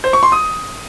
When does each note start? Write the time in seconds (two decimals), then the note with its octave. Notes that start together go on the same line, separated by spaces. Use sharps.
0.04 C5
0.13 C#6
0.23 C6
0.32 D#6